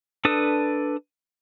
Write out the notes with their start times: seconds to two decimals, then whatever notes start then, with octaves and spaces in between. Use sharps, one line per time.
0.25 D4 A4 B4 D#6